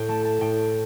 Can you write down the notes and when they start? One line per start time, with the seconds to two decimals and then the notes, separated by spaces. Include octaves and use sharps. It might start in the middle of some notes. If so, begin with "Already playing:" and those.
Already playing: A2 G5
0.08 A3 A5
0.25 A5
0.41 A2 G5